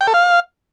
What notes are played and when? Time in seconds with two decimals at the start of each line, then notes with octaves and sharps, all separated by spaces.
0.01 G5
0.07 A4
0.14 F5